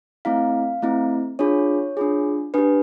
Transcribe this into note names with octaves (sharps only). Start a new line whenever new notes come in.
A3 C4 E4 F5
A3 C4 E4
D4 F4 G#4 C#5
D4 F4 G#4
D4 G4 B4